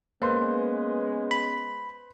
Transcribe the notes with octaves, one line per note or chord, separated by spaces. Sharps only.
G#3 A#3 B3 C#4 B4 C5 C6
B5